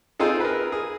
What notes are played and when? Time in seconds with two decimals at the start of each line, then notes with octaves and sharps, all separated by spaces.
0.19 C4 D#4 F4 G#4 A4
0.40 A#4 B4
0.72 G#4